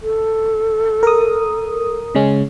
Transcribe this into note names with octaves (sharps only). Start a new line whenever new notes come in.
A4
A#4 D#6
C#3 G#3 C#4